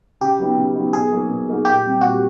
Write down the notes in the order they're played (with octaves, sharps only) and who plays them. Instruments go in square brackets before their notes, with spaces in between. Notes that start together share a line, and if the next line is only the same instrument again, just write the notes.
[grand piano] C#3 [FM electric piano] G4
[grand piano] F#3 B3 D#4
C#3
F#3 B3 D#4
[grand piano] B2 [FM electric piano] G#4
[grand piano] F#3 A#3 D#4 F#4
B2
F#3 A#3 D#4 F#4
[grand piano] A#2 [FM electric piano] G4
[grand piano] G3 C4
[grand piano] A#2 [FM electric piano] F#4